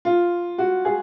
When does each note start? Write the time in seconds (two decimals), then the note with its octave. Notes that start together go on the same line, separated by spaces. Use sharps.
0.05 F4
0.58 F#4
0.85 G#4